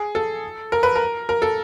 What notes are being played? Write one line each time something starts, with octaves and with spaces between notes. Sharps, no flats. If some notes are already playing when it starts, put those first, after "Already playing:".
Already playing: G#4
A4
A#4
B4
A#4
A#4
A4